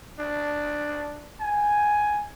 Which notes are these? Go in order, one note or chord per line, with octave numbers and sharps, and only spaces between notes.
D4
G#5